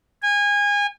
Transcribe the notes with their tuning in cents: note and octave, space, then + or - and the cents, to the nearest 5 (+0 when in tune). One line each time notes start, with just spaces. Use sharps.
G#5 -25